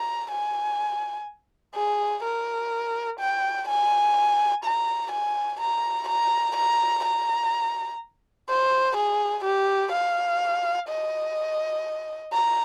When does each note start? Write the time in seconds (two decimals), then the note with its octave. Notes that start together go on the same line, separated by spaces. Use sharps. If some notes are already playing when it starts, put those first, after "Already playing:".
Already playing: A#5
0.31 G#5
1.75 G#4
2.23 A#4
3.19 G5
3.68 G#5
4.64 A#5
5.11 G#5
5.60 A#5
6.08 A#5
6.56 A#5
7.04 A#5
8.49 C5
8.97 G#4
9.44 G4
9.92 F5
10.89 D#5
12.33 A#5